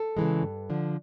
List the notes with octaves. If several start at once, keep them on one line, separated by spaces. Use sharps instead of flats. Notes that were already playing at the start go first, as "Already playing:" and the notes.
Already playing: A4
C#3 E3 G#3
G2
D3 F3